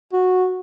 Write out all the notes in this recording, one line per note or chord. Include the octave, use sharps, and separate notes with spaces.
F#4